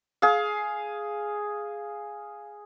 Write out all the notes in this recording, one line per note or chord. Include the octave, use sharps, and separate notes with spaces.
G#4 F5